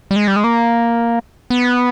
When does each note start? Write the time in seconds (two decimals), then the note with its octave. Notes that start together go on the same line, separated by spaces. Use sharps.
0.11 G3
0.16 G#3
0.28 G3
0.36 G#3
0.44 A#3
1.50 B3